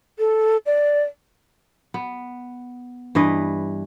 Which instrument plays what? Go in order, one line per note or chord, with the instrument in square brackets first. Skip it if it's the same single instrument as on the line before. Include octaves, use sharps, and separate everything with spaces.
[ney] A4
D5
[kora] B3
G2 E3 B4 D#5